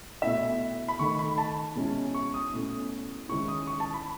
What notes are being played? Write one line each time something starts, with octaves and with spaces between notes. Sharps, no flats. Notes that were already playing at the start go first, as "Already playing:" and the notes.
B2 A3 E4 E5
B5
D#3 A3 D#4 C#6
B5
A5
B2 G#3 C#4 E4
C#6
D#6
B2 A3 C#4 E4
D#3 G#3 C#4 E4 C#6
D#6
C#6
A5
B5